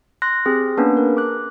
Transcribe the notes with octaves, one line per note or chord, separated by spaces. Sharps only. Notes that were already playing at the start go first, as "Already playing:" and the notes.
C6 F#6 A#6
C4 G4 G#4
A#3 B3 C#4 D4 B4
A#4
D6 F#6